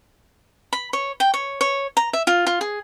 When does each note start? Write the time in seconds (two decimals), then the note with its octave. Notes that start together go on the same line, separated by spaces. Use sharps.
0.73 B5
0.93 C#5
1.20 G5
1.34 C#5
1.61 C#5
1.97 A#5
2.13 E5
2.27 F4
2.47 F4
2.61 G#4